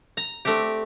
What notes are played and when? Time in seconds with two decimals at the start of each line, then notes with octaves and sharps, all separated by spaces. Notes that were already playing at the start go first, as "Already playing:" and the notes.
0.17 A#5
0.45 A3 C4 D4 G4